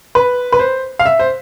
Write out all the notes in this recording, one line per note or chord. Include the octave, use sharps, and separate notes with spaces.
B4
B4
C5
F5
E5
C5